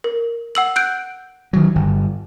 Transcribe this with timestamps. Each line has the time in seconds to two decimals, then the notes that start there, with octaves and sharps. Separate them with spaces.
0.04 A#4
0.55 F#5 E6 F#7
0.76 F#6 G6 D7
1.53 D#3 F#3
1.75 G1